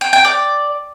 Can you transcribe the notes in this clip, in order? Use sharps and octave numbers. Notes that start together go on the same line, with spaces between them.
G5
G5
D5